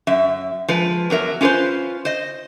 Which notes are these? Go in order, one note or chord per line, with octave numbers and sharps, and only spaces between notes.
F#2 E5
F3 G#3 B4
E2 F#3 A#4 E5
C#4 F4 G#4 B4 C5
C5 D#5